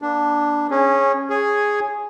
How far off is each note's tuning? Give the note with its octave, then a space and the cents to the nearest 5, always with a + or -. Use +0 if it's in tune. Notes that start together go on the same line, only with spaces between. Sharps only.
A#3 +40 D4 +0
C#4 -15 G#4 +0
G#4 +0 C#5 +0 G#5 +0